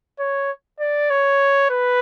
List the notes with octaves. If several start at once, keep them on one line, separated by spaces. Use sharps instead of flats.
C#5
D5
C#5
B4